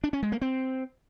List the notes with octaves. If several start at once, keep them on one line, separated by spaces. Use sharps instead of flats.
D4
C#4
G#3
A#3
C4